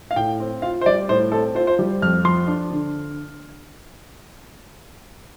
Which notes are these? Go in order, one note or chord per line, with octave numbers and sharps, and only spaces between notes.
F5
A2 G5
C4
F4 F5
C5
G3 D5
A2 C5
C4 A4
F4 C5
C5
G3
F2 F6
F3 C6
D4
D3